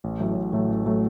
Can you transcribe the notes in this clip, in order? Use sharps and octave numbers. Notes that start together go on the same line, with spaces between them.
A1
A2 F#3 A3
A1
A2 F#3 A3
A1
A2 F#3 A3